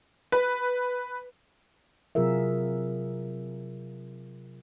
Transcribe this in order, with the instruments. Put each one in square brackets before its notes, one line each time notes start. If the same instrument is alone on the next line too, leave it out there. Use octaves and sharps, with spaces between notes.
[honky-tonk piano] B4
[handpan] C3 F#3 F4 G#4 A#4 E5